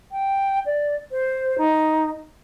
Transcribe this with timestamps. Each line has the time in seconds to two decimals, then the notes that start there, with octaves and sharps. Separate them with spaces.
0.12 G5
0.66 D5
1.12 C5
1.58 D#4